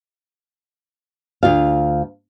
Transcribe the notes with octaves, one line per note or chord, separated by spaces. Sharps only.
D2 F4 F5